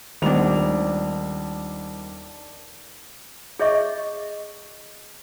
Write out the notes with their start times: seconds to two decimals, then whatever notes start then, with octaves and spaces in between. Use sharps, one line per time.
0.22 D#1 D#3 G#3 A3 B3 D4 F7
3.60 G#4 C#5 D#5 E5 C#6 D6